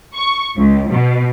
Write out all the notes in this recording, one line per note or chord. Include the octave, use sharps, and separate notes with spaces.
C#6
C#2
B2